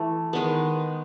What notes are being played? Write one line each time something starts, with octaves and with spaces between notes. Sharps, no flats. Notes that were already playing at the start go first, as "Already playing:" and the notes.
Already playing: E3 A3 A4
D#3 G#3 B3